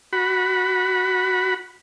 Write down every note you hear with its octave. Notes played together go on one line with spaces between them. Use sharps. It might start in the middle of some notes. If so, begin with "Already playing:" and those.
F#4 B5